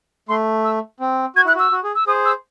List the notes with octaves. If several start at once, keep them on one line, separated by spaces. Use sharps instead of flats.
A3 C6
E6
C4
F#4 G#6
E4 F#6
F#4 E6
F#4
G#4
E6
G#4 C5 D#6
E6